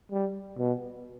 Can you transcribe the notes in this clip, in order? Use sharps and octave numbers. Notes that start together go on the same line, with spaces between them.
G3
B2